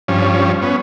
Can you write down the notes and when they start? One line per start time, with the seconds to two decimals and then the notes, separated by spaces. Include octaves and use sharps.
0.08 G2 F3 C#4
0.62 B3 C#4